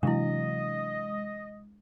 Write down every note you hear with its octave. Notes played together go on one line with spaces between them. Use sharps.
C3 E3 F#3 G#3 D4 E4 D#5